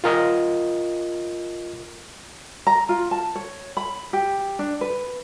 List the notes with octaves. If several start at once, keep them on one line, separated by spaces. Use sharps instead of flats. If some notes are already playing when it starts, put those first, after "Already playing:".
F4 A#4 D#5
A#5
F4
A5
C#5
B5
G4
D4
B4